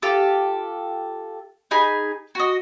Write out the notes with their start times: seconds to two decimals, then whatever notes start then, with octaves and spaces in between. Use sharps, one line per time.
0.02 F4 G4 A4
1.71 D#4 G#4 G#5 B5
2.35 F#4 D#5